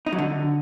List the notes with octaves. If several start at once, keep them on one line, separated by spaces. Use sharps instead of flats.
D#4
F#3
D3